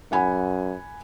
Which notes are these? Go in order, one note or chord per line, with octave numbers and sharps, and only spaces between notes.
F#2 F#5 G#5 B5